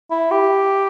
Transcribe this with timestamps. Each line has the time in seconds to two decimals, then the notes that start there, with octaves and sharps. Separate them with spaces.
0.11 E4
0.31 G4